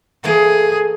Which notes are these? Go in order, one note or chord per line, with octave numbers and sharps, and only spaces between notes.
E3 A3 A#3 G#4